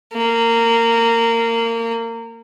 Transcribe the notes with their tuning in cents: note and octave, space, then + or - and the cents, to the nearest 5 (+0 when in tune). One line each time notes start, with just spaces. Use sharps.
A#3 -20